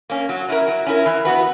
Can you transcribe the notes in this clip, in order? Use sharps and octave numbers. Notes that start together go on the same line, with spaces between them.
A#3 C#4
F#3
C#4 E4 A#4
F#3
C#4 E4 A#4
E3
B3 F#4 B4